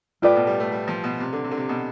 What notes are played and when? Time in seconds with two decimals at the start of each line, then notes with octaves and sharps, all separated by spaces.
0.22 A2 F4 B4 D5 G5
0.35 B2
0.47 G3
0.60 A3
0.72 G3
0.88 F3
1.03 B2
1.20 C3
1.32 D3
1.44 C3
1.51 D3
1.57 C3
1.69 B2